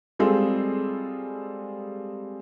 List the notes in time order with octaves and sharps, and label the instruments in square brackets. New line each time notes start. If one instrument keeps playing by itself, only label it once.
[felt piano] G3 G#3 C4 F4 G#4 A4